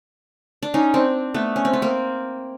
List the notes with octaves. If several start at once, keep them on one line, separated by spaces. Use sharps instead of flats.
D4
C#4 D#4
C4 D4
A3 B3
C#4
C4
B3
A#3 C4